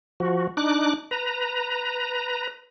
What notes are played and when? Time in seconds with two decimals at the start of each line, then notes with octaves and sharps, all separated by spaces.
0.20 F3 F#4
0.57 D4 D#4 D6 F#6
1.11 B4 A#5